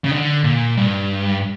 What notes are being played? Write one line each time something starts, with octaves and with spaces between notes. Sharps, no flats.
C#3
D3
A#2
G2